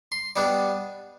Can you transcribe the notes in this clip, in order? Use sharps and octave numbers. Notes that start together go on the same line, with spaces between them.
C6
B2 G3 B3 D4 D5